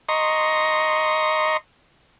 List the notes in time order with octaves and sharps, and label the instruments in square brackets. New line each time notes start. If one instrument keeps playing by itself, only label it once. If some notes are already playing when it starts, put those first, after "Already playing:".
[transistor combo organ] D#5 A#5 C6 C#6